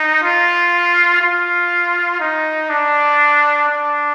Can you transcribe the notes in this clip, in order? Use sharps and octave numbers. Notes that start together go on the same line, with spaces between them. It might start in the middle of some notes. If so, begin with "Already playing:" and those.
Already playing: D#4
F4
F4
D#4
D4
D4